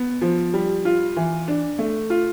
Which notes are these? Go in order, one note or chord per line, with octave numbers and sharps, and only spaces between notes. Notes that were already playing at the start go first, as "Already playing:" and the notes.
Already playing: B3
F3
G3
F4
E3
D4
A3
F4